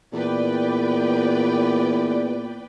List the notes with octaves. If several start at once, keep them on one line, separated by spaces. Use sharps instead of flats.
E2 A#2 B4 D5 G5